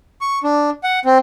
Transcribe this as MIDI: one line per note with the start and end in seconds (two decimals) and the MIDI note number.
0.21 0.39 85
0.44 0.70 62
0.84 0.99 78
1.05 1.18 60